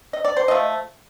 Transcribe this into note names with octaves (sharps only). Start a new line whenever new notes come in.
D#5
D5
C5
F3 A3 D#5